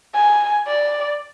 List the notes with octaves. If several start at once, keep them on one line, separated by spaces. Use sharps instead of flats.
G#5
D5